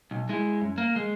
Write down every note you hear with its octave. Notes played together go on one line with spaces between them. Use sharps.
B1
G#3 E4
F#2
A#3
G#3